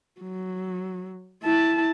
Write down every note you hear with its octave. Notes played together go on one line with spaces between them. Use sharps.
F#3
E4 A5